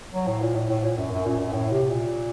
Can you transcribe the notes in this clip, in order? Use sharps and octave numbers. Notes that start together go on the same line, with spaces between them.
F#3
A2
A#2
A2
A2
A#2
F#2
F#2
A#2
F#2
A2
C3
A#2